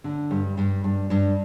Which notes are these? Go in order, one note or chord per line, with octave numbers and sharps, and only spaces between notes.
D3
G2
G2
G2
G2